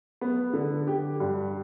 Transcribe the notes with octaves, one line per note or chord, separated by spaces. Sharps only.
B3
D3
G4
G2